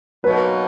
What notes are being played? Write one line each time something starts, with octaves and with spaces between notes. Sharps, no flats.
B2 F#3 A#3 D#4 B4